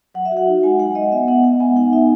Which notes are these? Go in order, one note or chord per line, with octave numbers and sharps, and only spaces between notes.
F#3 F#5
E5
F#4
F#5
D#4
G#3 G#5
G#3 F#5
G#3 D#5
B3 E5
B3 F#5
B3 F#5
B3 G#5
D#4 F#5
D#4 E5